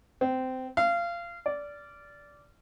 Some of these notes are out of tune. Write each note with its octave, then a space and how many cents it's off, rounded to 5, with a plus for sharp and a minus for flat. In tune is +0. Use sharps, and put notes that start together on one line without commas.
C4 -20
F5 -25
D5 -15